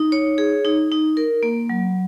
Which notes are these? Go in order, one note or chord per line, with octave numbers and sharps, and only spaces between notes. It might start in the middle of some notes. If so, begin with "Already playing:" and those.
Already playing: D#4
C#5
G#4
D#4
D#4
A#4
A#3
F#3